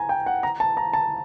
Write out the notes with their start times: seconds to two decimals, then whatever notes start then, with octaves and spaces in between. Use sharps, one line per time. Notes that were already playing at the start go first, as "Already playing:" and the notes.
Already playing: G#5 A#5
0.09 G5
0.26 F#5
0.43 A#5
0.60 A5
0.77 A#5
0.93 A5